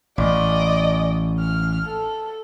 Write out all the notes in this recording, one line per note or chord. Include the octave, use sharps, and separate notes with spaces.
A1 D5 D#5
F6
A4